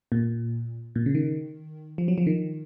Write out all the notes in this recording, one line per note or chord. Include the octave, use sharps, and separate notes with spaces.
A#2
A#2
C#3
D#3
F3
F#3
F3
D#3